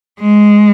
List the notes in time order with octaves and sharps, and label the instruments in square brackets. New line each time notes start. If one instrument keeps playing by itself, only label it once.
[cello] G#3